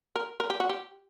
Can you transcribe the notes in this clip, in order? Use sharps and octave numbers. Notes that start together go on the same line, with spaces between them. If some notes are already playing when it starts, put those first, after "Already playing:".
A#4
A#4
G4
F#4
G4